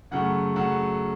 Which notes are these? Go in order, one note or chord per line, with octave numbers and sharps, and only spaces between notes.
F#2 C#3 F#3 A3 F#5
C#3 F#3 A3 F#5